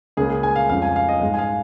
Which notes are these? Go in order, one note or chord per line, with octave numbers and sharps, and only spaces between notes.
C#2 C#3 A#3 G#4
G#4
G#5
F5
F2 C#3 G#3 F5
G#5
F5
D#5
G#2 G#3 F5
G#5
F5